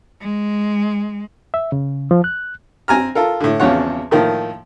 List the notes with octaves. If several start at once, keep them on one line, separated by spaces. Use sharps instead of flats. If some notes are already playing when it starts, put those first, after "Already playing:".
G#3
E5
C#3
F3
F#6
C4 G#5 A#5 F6
F4 A4 A#4
A2 D3
G#1 E2 C#3 F3 C#5 F#5
A2 D#3 F3 A#3